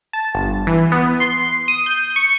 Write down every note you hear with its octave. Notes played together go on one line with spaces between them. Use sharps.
A5
G1
E3
B3
C6
D#6
G6
C#6